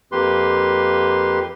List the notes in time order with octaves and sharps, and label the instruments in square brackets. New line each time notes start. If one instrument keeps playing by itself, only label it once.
[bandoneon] F2 A#3 G4 B4 C6